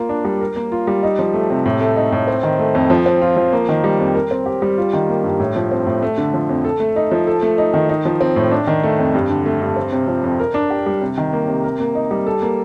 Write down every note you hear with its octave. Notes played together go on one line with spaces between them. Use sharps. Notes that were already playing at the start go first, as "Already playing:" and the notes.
Already playing: A#3 F4
D4
G3
A#4
A#3
F4
G3
D#4
F3
A3
C3
A2
A3
D#4
A2
C4
D#3
A3
F2
F3
C4
F4
F3
A#3
D#3
G3
F2
A#4
C4
G4
G3
F4
D#3
A#3
G2
A2
F3
C4
A2
A3
D3
F3
F2
A4
A3
D#4
F3
A4
A3
D#4
D#3
D#4
F3
C4
A2
D4
D#3
A3
F2
G2
D3
A3
G2
C4
C3
F3
F2
A#4
D4
G4
G3
C3
D#3
A#3
C3
A#4
A#3
D#4
G3
A4
A#3